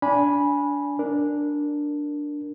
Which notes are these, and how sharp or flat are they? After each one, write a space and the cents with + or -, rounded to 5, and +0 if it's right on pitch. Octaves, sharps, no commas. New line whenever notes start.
D4 -25 G#5 +0 B5 -15
D4 +0 A#4 +0